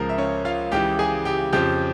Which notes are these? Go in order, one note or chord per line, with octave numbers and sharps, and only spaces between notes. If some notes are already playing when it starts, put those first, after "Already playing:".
Already playing: C#2 C#3 F3 A#4
E5
C#4 C#5
F4 F5
C#2 C#3 E3 G4 G5
G#4 G#5
G4 G5
F2 C#3 F3 G4 G5